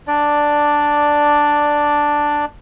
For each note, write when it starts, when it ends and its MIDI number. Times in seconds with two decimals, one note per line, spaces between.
0.08 2.45 62
0.08 2.45 74